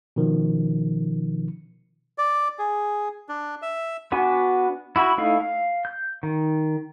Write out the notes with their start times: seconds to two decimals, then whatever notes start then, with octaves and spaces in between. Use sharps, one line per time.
0.16 B2 D#3 F3
2.18 D5
2.59 G#4
3.29 D4
3.62 E5
4.12 B3 D4 F#4 G#5
4.96 E4 F#4 B5
5.18 A3 D#4 E4 F5
5.41 F5
5.85 G6
6.23 D#3